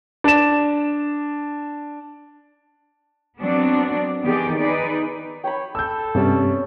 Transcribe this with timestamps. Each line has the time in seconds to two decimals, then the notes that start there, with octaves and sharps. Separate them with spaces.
0.24 D4 E7
3.41 F#3 B3 C4 D4 D5
4.23 D#3 B3 G4 G#4 D5
4.57 D#4 G#4 B4 D5
5.44 C#5 G5 B5
5.75 A4 E6 G6
6.15 G2 C3 G3 B3 C#4 C#5 E6